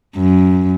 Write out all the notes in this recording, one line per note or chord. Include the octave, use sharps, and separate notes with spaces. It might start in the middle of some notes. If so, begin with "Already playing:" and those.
F#2